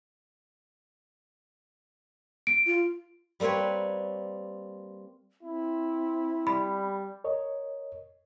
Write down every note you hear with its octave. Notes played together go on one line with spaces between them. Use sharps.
D7
F4
G3 A#3 C4 B4 C#5
C4 E4
G3 B5
A#4 C#5 D#5